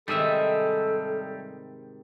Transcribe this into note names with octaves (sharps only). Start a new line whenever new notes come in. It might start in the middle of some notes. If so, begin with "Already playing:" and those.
G#2 C3 D#3 G3 G#4 A4 E5